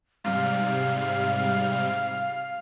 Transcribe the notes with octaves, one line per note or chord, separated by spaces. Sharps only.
G#2 C3 G3 F5